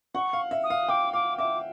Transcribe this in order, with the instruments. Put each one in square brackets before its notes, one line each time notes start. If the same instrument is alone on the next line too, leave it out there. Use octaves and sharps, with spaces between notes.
[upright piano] F#5 [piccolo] C#6
[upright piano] F5
E5
[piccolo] D#6
[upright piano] F5
[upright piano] G5 [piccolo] D6
[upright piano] F5 [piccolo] D6
[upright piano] E5 [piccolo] D6